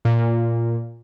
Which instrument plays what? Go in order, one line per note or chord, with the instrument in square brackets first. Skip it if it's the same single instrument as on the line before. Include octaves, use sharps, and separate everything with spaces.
[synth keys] A#2